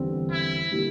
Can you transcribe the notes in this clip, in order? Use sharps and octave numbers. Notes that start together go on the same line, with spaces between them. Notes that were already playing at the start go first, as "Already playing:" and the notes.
Already playing: E2 D3 G3 C4
E4
D3 G3 A#3 E4 G4